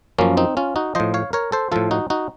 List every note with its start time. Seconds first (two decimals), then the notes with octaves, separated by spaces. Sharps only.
0.18 F#2 F3 A#3 C#4
0.37 C4 D#4
0.57 C#4 F4
0.76 D#4 F#4
0.95 A2 F3 C5 D#5
1.14 C#5 F5
1.33 A#4 C#5
1.52 A4 C5
1.72 A2 F3 F4 A4
1.91 D#4 F#4
2.10 D#4 F#4